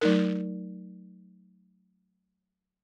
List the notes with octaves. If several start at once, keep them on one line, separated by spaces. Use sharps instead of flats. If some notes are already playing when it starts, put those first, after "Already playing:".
F#3 A3 D#4 A#4